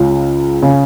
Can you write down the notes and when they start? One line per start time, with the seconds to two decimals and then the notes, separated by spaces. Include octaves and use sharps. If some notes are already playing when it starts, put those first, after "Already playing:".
Already playing: C#2 C#3
0.62 C#3